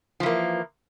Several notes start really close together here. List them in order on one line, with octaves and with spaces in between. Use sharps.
F3 E3 A#3